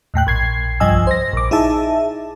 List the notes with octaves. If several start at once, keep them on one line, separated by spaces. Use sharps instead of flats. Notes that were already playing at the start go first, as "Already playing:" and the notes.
D#2 A2 G5 F#6
A#1 G#6 C7
C2 G2 F3 D#5 G#5 E6
C5 A#6
A#1 D6
D#4 E4 G#4 E5 A5